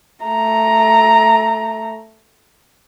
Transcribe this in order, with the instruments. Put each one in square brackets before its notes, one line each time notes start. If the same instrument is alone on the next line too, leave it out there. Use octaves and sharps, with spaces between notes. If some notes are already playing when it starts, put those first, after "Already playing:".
[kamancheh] A3 A#5